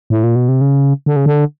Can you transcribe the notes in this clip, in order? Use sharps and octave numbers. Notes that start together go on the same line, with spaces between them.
A2
A#2
B2
C3
C#3
D3
C#3
D3